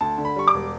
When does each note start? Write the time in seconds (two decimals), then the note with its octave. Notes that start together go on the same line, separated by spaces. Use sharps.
0.01 D2 A5
0.18 D3
0.25 B5
0.36 G3 C#6
0.48 D6
0.54 E1